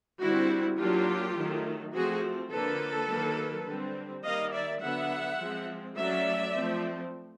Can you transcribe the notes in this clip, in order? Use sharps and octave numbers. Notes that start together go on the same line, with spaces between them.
D3 G3 C4 E4 F#4
F#3 A#3 D4 F4 G4
D#3 F#3 A3
F3 A3 C4 F#4 G#4
D3 F3 A#3 A4 B4
D#3 F#3 A#3
D3 G3 C4
D#3 G3 A#3 D#5 F5
D5 E5
D3 F#3 B3 E5 F#5
F3 G#3 C4
F#3 A3 C#4 D5 E5
F3 A3 C4